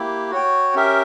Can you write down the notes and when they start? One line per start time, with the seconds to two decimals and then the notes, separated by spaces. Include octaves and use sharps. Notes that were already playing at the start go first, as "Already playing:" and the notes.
Already playing: A#3 E4 G4
0.31 F#4 C#5 G5
0.75 C#4 G4 A#4 E5